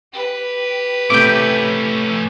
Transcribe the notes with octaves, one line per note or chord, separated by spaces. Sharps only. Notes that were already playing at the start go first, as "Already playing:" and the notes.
G4 B4
A2 C3 A3 C#4 D6 G6